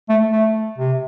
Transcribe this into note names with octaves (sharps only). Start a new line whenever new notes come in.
A3
A3
C3